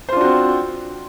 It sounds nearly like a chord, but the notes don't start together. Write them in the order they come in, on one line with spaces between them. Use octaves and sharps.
C5 F4 D4 F#4 C4